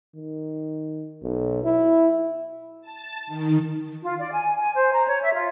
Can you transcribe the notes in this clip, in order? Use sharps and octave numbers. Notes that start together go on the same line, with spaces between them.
D#3
B1
E4
A5
D#3
F4
D5
G#5
G#5
C5
A#5
C#5
E5
F4